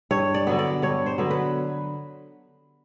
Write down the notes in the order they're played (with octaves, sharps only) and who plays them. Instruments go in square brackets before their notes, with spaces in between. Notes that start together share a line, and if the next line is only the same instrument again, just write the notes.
[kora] G2 C#5
D5
D3 F#3 B3
D5
G2 C#5
C5
D3 F#3 B3
B4